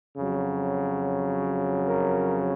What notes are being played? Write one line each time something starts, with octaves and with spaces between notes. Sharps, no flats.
F2 C#3 F#3
A#4